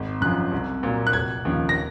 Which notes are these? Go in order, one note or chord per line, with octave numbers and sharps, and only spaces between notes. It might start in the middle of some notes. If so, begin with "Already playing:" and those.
Already playing: G#1
F#2 F3 F#6
C2
A#2 F#3
F#6
F1 G#6
D#2 C#3 F3
A#6